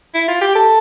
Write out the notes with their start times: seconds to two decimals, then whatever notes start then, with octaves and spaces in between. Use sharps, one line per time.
0.14 E4
0.28 F4
0.41 G4
0.55 A4